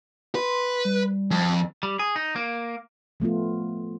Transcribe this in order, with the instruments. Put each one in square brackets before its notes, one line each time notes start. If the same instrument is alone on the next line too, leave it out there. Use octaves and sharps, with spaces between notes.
[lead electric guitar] B4 [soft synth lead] C6
[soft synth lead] G3
[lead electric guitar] F2
G3
G#4
D#4
A#3
[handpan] F3 A3 B3 F4